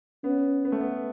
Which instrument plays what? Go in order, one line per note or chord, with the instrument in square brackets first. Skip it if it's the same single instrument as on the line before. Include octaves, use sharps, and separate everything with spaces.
[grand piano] B3 [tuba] C#4
[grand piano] B3
A3
B3